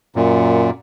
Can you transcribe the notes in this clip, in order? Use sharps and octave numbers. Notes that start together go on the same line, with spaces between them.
F#2 A#2